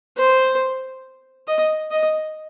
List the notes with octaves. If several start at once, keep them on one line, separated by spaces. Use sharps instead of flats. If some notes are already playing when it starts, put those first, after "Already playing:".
C5
D#5
D#5